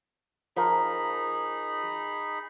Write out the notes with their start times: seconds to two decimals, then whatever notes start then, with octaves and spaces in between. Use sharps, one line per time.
0.57 F3 D#4 G#4 A#4 B5